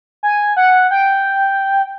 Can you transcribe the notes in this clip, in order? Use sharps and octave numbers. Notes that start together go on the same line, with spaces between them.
G#5
F#5
G5